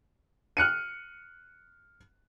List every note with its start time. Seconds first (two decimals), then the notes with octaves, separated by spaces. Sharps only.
0.57 F6 F#6 C#7 D#7